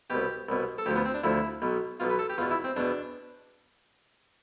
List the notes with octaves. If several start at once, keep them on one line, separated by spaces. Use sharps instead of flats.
C2 B2 G4
C2 B2
A4
D2 D3 F3 G4
B3
C4
D4
D2 D3 F3 E4
B1 B2
B1 B2 F4
B4
A4
G4
E2 B2 F4
E4
C4
E2 B2 D4